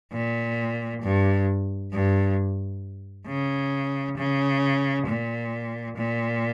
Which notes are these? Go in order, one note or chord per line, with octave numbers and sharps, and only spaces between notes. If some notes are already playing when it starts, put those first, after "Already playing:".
A#2
G2
G2
C#3
C#3
A#2
A#2